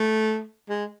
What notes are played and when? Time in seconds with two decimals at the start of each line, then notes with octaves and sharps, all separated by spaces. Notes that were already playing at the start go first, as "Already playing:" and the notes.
Already playing: A3
0.69 G#3